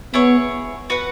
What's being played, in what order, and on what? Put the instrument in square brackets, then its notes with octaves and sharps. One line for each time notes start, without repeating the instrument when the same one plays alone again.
[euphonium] B3 [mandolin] E4 G#4 C#5
[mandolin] F#4 B4 F#5